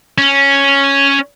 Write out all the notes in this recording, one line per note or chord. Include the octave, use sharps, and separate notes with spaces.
C#4